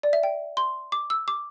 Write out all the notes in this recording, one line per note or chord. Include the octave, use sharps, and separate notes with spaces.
D5
E5
G5
C6
D6
E6
D6